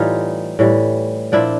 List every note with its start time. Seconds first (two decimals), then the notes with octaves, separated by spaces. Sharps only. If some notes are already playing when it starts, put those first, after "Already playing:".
Already playing: A2 E3 G3 D#4 F4
0.59 A2 E3 G3
1.32 A#2 F3 D4 E4